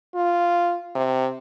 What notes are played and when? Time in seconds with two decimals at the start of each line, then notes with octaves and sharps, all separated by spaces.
0.15 F4
0.95 C3